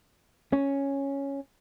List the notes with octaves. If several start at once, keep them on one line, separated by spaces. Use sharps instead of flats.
C#4